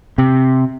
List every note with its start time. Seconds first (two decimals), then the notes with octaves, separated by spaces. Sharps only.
0.18 C3